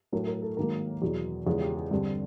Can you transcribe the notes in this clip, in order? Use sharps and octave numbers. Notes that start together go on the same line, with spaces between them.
A2 F#3 A3 A#4
A#4
A4
G#2 D#3 F#3 A#3 A#4
E2 B2 F#3 G#4
E2 C#3 E3 G#3 F4
G4
G#4
G2 D3 G3 C4 A4